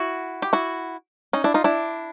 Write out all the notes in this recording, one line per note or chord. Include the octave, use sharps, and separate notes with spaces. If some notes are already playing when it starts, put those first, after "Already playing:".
Already playing: E4 F#4
G4
E4 F#4
C#4 D#4
D4 E4
D#4 F4
D4 E4